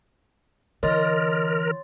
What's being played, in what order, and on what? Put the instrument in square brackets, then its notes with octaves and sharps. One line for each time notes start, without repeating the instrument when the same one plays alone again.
[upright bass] D3 E3 [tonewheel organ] A#4 [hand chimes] C#5 C6 A6 [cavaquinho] D#5